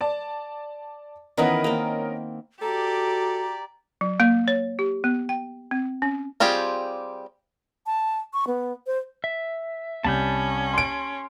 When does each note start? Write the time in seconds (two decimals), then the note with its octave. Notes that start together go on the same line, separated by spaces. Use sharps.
0.01 D5 A5
1.37 D#3 E3 B3 C#4 A#4 D#5
1.64 A#3 C4
2.62 F#4 G4 A4 D5 A#5
4.01 F#3
4.20 A#3
4.48 C#5
4.79 G4
5.04 B3
5.29 G5
5.71 C4
6.02 C#4
6.40 G3 C4 F4 G4 G#4
7.86 A5
8.33 C#6
8.47 B3
8.87 C5
9.24 E5
10.05 C2 C#4 A5 B5 G6
10.74 C6 D7